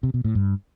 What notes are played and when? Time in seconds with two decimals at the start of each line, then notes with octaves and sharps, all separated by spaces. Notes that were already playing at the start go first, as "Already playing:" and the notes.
0.03 C3
0.14 B2
0.25 A2
0.35 G2